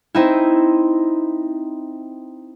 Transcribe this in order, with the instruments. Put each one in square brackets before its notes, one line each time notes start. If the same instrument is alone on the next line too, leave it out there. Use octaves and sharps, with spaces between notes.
[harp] C4 D#4 E4